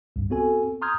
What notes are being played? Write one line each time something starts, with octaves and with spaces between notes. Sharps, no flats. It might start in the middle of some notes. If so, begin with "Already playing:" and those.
C2 G2
B3 C4 F#4 A4 G#5
A#5 C6 D#6 F6 G6 G#6